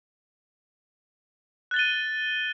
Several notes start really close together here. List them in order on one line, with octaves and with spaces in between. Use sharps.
F#6 A6 G7 D#7